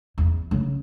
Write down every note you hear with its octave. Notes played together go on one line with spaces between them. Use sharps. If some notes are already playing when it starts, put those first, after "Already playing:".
E2
C#3